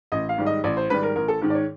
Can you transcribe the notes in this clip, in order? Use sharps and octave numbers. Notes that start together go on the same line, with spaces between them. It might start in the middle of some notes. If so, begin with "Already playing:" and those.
A1 D#5
F5
G#2 D#3 G3
D#5
A1 D5
C5
G#2 D#3 G3 B4
A#4
A1 A#4
A4
G#2 D#3
D5
C#5